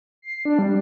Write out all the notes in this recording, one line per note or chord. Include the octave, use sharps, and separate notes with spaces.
C7
D4
G3